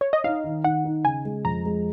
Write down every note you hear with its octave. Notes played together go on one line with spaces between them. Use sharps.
C#5
D#5
D#4 F5
D#3
D#3 F#5
D#4
C#3 G#5
G#3
F2 A#5
G#3